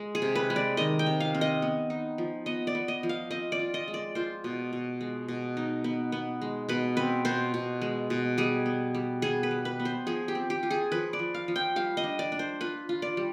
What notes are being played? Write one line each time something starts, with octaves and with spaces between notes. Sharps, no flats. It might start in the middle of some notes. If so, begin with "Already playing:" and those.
Already playing: G#3
G#4
C3
B4
G#3
D5
D#3 D#5
G5
C3
F5
C4
D#5
B3
D#4
F3
B3 D#5
D5
B3
D#5
F3
F5
C4 D#5
D5
F4
D#5
G#3
D5
F4 C5
B2
B2
G#3
B2
D#4
B3
B3
G#3
B2 B4
C4 B4
B2 C5
B2
G#3
B2
G3 G#4
B3
G3
B3 G#4
B4
G3
B4
B3
C5
F3 G#4
G4
C4
G4
F4
G#4
F3 B4
D5
F3
F5
F3
G5
G3 F5
D#5
D4
D5
D4
C5
F4 B4
F4
D5
G3